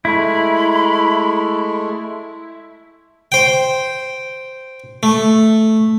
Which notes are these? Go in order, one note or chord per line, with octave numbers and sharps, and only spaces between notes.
G#3 A3 E4 B5
C5 G5
A3